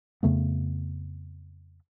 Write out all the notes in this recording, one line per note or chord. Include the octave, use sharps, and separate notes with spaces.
F2 C#3 A3 B3